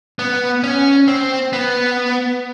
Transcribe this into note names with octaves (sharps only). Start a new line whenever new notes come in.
B3
C#4
C4
B3